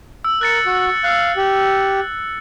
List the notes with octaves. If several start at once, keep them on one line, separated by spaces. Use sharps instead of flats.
E6
A#4 F#6 A6 C#7
F#4
F5 E6 F#6
G4